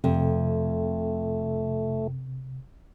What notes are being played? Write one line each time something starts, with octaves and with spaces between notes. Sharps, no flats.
F2 C3 A3